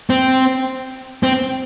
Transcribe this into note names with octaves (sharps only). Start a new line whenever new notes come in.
C4
C4